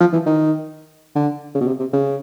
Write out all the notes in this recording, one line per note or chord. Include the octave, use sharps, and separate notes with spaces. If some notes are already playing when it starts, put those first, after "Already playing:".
F3
E3
D#3
D3
C#3
B2
C3
C3
C#3